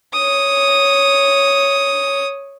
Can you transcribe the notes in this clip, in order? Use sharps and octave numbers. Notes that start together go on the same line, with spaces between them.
C#5 D#6